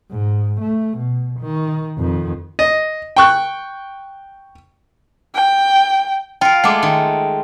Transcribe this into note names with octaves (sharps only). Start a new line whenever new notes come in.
G#2
A3
B2
D#3
F2 D#3
D#5
G5 C#6 F#6
G5
F4 A#4 G5
G#3 A3 F#5 D6
D#3